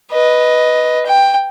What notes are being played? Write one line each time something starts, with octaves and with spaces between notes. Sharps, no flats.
B4 D#5
G5